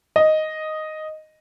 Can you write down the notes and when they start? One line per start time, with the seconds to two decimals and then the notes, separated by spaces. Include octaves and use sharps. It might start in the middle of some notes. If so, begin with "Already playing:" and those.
0.16 D#5